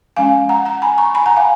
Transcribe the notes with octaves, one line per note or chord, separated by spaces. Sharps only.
F3 G#3 C#4 F5 G#5
F#5 A#5
F#5 A#5
G#5 B5
A#5 C#6
G#5 B5
F#5 A#5
F5 G#5